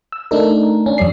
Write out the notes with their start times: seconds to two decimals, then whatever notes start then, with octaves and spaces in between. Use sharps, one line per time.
0.12 E6
0.31 A3 D4 D#4 A#4
0.86 C#4 D4
0.98 F2 G3 D5 C7